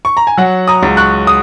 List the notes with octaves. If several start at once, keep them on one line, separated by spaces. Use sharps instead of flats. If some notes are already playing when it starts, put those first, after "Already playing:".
C#6
A#5
G#5
F#3 F#5
A#5 D#6
C#2
C#6 F#6
D#6